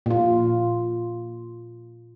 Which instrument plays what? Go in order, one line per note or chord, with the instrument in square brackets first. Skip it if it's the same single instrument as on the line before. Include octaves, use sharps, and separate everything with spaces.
[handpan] A#2 F4